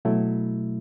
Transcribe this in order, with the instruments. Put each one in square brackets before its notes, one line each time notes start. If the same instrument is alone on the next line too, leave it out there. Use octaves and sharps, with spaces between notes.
[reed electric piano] B2 F#3 A3 E4